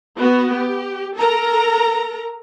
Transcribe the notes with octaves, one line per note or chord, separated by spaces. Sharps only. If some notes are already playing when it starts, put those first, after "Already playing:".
B3 F#4
G4
A4 A#4 A#5